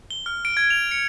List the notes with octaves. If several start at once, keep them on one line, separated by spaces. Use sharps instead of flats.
G7
F6
D7
G#6
F7
C#7